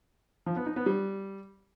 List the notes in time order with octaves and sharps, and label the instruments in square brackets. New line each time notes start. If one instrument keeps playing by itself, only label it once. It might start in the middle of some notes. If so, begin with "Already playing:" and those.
[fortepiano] F3
B3
D#4
B3
G3